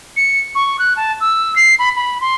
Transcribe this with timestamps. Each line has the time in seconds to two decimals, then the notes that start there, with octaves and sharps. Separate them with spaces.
0.17 C#7
0.55 C#6
0.79 F#6
0.96 A5
1.21 E6
1.56 C7
1.79 B5
1.96 B5
2.21 C6